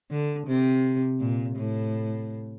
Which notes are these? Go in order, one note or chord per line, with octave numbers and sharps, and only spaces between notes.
D3
C3
A#2
A2